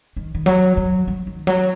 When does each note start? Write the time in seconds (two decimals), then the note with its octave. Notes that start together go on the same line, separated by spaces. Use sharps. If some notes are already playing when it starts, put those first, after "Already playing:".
0.16 D#3
0.35 D#3
0.46 F#3
0.77 F#3
1.08 F#3
1.27 D#3
1.47 F#3